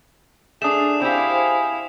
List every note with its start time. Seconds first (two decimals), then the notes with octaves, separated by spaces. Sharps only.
0.62 A3 D4 G#4 D#6 E7
1.01 C4 E4 G4 C5 F5 G#5